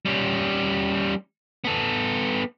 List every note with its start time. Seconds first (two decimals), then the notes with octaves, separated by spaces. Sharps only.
0.05 G3 C#4
1.64 B3 A4